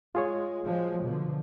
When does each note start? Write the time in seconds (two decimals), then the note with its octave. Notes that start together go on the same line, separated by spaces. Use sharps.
0.15 G#3 F4 G#4 C#5
0.64 F3 F#3 G#3
1.04 B2 D3 F3